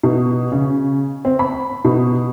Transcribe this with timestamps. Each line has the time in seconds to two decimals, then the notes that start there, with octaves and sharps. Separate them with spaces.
0.03 B2
0.52 C#3
1.25 C4
1.39 B5
1.85 B2